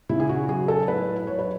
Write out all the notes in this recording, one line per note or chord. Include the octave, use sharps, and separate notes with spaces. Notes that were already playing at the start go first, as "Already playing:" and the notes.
C#3 E4
G#4
F#4
F#3 G#4
A4
A2 B4
F#3 C#5
B4